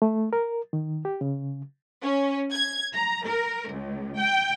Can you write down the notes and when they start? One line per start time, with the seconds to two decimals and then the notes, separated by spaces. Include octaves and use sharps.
0.02 A3
0.33 A#4
0.73 D#3
1.05 G4
1.21 C#3
2.02 C#4
2.52 G#6
2.94 A#5
3.28 A#4
3.70 C#2
4.19 G5